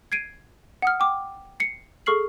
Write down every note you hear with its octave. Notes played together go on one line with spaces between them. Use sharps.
G#6 C7 D7 D#7
F#5 D#6 F6
G5 D6
C7 C#7
G#4 A4 C#6 F6 C7 F#7